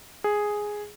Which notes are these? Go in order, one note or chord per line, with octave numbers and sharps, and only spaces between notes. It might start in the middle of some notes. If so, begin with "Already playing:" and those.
G#4